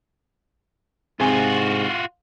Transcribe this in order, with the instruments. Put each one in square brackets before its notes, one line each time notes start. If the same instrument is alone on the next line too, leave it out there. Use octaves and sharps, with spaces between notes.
[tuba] G#2 [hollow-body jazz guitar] C3 G#4 [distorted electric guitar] F4 F#4